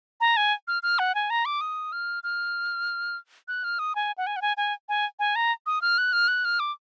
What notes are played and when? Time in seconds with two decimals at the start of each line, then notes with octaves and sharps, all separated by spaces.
0.21 A#5
0.37 G#5
0.68 F6
0.83 F6
0.99 F#5
1.15 G#5
1.30 A#5
1.45 D6
1.61 D#6
1.92 F6
2.23 F6
3.48 F#6
3.64 F6
3.79 D#6
3.95 G#5
4.18 F#5
4.27 G#5
4.36 F#5
4.42 G#5
4.57 G#5
4.89 G#5
5.19 G#5
5.36 A#5
5.66 D#6
5.82 F6
5.98 F#6
6.13 F6
6.28 F#6
6.45 F6
6.60 D6